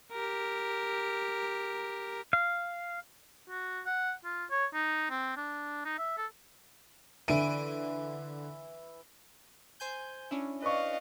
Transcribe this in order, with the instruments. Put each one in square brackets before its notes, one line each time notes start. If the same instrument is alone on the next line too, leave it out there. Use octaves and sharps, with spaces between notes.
[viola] G4 A#4
[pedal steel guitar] F5
[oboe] F#4
F#5
F4
C#5
D#4
C4
D4
D#4
E5
A4
[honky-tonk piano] D3 D7 D#7 [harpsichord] E3
[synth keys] C5 G#5 G6
C#4 D4 E4
[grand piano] B4 D5 C#6 [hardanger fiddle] D#5 F5